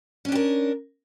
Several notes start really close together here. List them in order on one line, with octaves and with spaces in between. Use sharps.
C#4 D4 G4 A#4